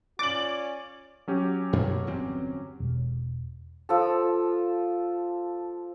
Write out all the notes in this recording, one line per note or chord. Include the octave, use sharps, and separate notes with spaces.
C#4 F4 D5 D6 A6 F#7
F#3 C#4 G4
F#2 B2
G1 E2 C4
E1
F3 A4